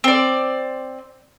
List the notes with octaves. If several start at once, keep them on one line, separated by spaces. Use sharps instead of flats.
C4 D5